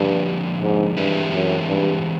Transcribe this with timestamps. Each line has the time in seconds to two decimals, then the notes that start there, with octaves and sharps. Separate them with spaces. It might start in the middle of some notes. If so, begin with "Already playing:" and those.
Already playing: G2 D3 F3 A#3 D4 G4
0.62 G#2
0.97 G2 E3 G#3 C4 E4 G4
1.32 F#2
1.68 G2